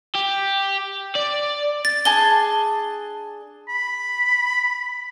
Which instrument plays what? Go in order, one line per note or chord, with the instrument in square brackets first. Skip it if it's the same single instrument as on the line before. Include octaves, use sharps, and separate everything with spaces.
[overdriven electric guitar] G4
D5
[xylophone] A6
[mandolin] D4 G#4 A5 [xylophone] G7
[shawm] B5